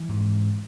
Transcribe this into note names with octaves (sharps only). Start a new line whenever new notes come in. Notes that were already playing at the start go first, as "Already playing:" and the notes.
Already playing: E3
G#2